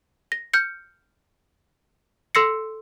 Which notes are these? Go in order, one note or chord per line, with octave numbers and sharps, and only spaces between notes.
A#6
F6 G6 C#7
A4 C6 E6 A#6 C7 C#7